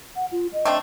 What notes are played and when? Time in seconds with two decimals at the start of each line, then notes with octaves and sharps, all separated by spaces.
0.16 F#5
0.32 F4
0.53 D#5
0.65 A3 C4 D4